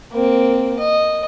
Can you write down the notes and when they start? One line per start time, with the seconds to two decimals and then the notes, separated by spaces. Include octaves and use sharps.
0.12 A#3 C4
0.79 D#5